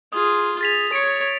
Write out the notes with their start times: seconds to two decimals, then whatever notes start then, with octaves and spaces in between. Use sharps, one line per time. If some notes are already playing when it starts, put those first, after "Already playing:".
0.13 F4 G#4 D#6
0.61 G#4 A6 B6 F7
0.92 C#5 C#7 D7